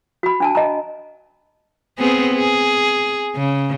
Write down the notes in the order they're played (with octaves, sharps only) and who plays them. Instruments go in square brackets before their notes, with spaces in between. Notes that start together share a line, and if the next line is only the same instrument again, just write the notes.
[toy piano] F#4 B5
D4 G#5 A5
D#5 A#5
[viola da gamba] B3 C4 G#4
G#4
C#3